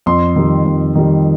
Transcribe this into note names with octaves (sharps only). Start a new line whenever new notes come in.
F2 C6
D#3 G3
F2
D#3 G3